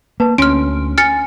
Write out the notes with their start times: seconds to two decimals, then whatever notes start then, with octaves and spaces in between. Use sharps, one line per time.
0.20 A#3 B4 A5
0.38 D2 C#4 C6 F6 D7
0.98 G#5 F6 A6 C#7